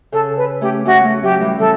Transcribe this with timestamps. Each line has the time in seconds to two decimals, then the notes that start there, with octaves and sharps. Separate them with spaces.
0.12 C#3 A4
0.37 B4
0.61 A3 C#4 G4
0.85 A3 C#4 F#4
1.04 A3 C#4
1.23 F#3 A3 G4
1.41 E3 G3
1.58 C#3 E3 A4